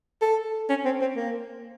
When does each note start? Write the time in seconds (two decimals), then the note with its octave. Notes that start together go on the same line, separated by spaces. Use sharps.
0.22 A4
0.69 C#4
0.85 C4
1.01 C4
1.16 A#3